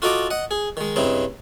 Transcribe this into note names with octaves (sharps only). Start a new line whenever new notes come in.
F4 F#4 A4 D#5 A#5 D6
D#5 F#5
G#4
D#3 G#3
G2 C#3 C4 D#4 E4